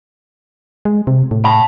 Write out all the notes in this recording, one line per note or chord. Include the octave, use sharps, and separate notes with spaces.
G#3
C3
A2
A5 B5